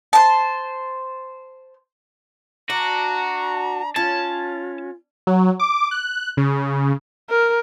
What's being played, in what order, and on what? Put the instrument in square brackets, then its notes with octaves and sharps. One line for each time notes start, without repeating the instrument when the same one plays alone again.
[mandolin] C5 A5
[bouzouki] D4 [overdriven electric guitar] F#4 [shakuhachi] A#5
[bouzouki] C#4 [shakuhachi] F4 [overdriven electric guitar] A5
[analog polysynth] F#3
D6
F#6
C#3
[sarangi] A#4